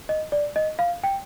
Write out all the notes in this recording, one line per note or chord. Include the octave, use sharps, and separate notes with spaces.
D#5
D5
D#5
F5
G5